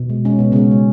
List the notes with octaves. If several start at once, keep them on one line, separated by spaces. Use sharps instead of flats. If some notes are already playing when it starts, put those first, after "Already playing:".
Already playing: B2
G#3
G#3 C#4
B2 B3
C#3 G#3 C#4
G#3